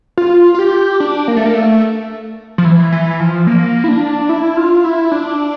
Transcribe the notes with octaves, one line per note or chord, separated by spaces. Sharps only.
F4
F4
G4
D4
A#3
A3
A#3
A3
F3
E3
E3
F3
A#3
E4
D4
E4
F4
E4
D4